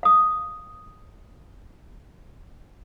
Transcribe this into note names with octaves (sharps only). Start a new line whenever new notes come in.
F5 D#6